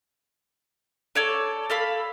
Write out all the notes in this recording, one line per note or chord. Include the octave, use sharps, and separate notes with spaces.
A4 C#5 D5
A4 F5 B5